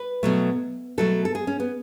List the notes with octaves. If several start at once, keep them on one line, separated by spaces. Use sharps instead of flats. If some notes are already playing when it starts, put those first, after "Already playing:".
Already playing: B4
B2 F#3 A3
B2 F#3 A3 A4
A4
G#4
C#4
B3